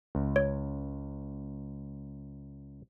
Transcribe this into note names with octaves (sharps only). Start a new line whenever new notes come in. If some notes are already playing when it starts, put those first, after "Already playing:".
C#2
C#5